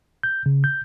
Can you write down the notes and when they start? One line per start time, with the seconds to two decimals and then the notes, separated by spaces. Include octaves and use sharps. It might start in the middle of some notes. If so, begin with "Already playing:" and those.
0.23 G6
0.46 C#3
0.64 G6